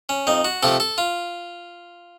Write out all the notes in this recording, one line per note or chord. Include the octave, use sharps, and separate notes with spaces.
C#4
F2 D#4
F#4
C3 F3 A3 A4
A4
F4